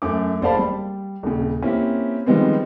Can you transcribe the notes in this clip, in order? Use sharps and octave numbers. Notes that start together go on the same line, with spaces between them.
F#2 A3 D6
F#1 C5 D5 F5 A5 B5
G3
D#1 C#3
A#3 C4 C#4 E4 G4
D#3 F3 G3 G#3 B3 C4